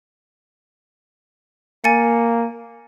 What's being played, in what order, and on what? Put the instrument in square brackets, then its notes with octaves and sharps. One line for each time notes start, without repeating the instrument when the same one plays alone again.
[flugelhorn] A#3 [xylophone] G#5 A6 C#7